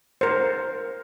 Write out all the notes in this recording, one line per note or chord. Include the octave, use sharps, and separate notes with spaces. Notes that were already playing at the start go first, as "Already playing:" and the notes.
A#4 C5